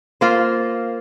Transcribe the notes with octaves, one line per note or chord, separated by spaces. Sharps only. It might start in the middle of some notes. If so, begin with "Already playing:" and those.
A#3 F4 C5